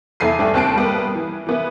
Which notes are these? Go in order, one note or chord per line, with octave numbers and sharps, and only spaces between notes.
E2 E4 A4 C7 D#7
G2 A3 D4 A4 G5 G#5
D#2 C4 A5 F#6 C7 D7
G3 A#3 B3
E3
E3 B3 E4